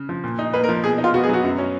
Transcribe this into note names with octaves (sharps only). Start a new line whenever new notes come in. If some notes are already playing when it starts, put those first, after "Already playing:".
Already playing: C#3
F3
A#2
D#4
A#3 B4
A#4
F3
B2 G#4
D#4
F4
B3 F#4
G#4
F#3 F#4
F#2
C#4